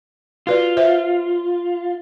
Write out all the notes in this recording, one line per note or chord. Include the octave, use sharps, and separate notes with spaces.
F4 F#4 B4 D5
C5 E5